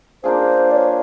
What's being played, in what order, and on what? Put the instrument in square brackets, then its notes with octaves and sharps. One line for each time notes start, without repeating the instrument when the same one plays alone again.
[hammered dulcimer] A#3 D4 F4 G#4 [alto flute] C5
[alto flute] D5
C#5